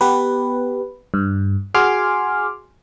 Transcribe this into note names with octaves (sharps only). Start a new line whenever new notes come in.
B3 G4 B4
G2
F#4 G#4 G#5 C6 D6 F6